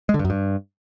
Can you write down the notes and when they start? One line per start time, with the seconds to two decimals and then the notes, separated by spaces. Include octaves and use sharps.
0.09 G#3
0.14 D3
0.19 G2
0.25 F#2
0.30 G2